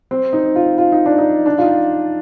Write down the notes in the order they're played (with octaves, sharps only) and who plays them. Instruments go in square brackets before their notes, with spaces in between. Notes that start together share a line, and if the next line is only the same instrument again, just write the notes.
[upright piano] C4
D#4
F4
F4
D#4
D4
D#4
D4
F4
D#4